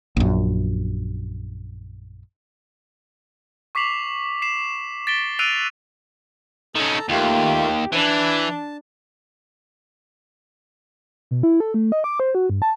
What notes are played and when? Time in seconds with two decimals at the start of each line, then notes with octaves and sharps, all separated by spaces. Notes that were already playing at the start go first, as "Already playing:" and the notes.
0.17 A#1 F#2
3.75 C#6 D6 B6 C7 F7 F#7
4.42 C7 E7
5.07 A6 B6 D7 E7 G7
5.39 E6 F#6 C7 D7 D#7 F7
6.75 D#3 C#4 A4 A5 A#5
7.09 D#2 A3 A#3 F4 G4
7.93 E3 D4 A5
11.31 B2
11.43 E4
11.60 A4
11.74 A3
11.92 D#5
12.04 D6
12.20 C5
12.35 F#4
12.50 G2
12.62 A5